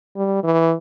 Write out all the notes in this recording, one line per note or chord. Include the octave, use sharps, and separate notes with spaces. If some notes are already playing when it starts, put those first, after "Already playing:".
G3
E3